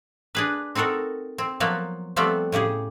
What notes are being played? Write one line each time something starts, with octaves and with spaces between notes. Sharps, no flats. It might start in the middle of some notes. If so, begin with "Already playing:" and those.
D4 G#4 B4
C4 D#4 F#4 A4 A#4
C4
F3 F#3 A#3 B3
F3 G3 A3 B3 C4
A2 C#3 G4 G#4